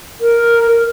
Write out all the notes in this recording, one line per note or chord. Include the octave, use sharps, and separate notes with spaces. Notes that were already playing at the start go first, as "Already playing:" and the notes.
A#4